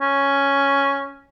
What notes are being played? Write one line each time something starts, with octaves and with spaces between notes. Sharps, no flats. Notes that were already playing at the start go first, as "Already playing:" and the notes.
C#4